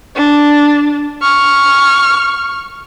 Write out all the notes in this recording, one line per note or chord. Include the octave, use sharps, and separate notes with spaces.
D4
C#6 F6